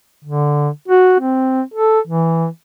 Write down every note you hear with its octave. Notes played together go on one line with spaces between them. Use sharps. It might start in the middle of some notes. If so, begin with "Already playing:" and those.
D3
F#4
C4
A4
E3